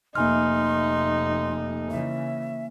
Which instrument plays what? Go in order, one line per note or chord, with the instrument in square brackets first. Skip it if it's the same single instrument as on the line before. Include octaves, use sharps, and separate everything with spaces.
[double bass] F1 [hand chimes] A#3 G#5 F6 [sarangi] D#4 [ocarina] C6
[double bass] C#3 E3 [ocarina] E5